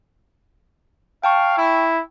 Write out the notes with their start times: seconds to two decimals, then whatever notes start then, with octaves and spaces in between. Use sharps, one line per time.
1.24 F5 G5 A5 C#6
1.57 E4